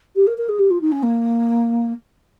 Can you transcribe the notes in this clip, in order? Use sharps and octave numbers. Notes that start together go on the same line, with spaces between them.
G4
A#4
A#4
G#4
G4
F4
D#4
C#4
A#3